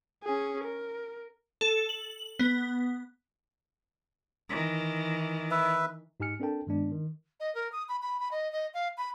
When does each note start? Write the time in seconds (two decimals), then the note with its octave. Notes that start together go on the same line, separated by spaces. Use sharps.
0.24 C#4 G#4
0.64 A#4
1.61 A4
1.89 F#7
2.39 B3
4.49 D#3 E3
5.51 B4 E5
6.20 G#2 D#4 G4 G#5 F6 C#7
6.40 C4 D4 A4 A#4 G5 A5
6.67 G2 D#3 G#3 B3 D4
6.91 D#3
7.40 D#5
7.55 A#4
7.72 D#6
7.88 B5
8.02 B5
8.20 B5
8.31 D#5
8.52 D#5
8.74 F5
8.97 B5